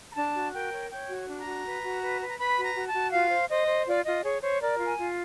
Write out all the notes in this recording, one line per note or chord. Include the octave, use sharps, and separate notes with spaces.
A#5
D4 A5
F#4
A#4 G5
C#5
C#5 G5
F#4
D4
A#5
F#4
B4
F#4
B4
B4
A#5
B4 B5
F#4
A#5
F#4
A5
F#4
F4 F5
C5
C5 D#5
C5
F4 D5
F4 D#5
G#4 C#5
C5 C#5
A#4 D5
F4
G#5
F4